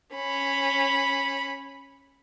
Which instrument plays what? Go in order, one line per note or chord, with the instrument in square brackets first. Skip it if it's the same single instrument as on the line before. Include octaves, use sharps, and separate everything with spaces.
[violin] C#4 B5